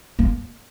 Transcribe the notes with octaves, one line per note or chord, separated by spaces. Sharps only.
A#3